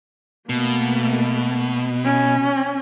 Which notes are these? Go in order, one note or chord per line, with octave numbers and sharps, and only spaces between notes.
B2 A3 A#3
C#4